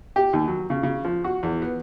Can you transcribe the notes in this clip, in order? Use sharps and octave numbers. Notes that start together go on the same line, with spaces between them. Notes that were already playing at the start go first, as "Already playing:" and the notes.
G4
D#2
F#3
C#3
C#3
F3
F#4
E2
B3